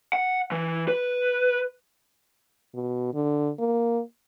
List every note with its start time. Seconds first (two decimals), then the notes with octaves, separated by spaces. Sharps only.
0.13 F#5
0.52 E3
0.88 B4
2.75 B2
3.14 D3
3.59 A#3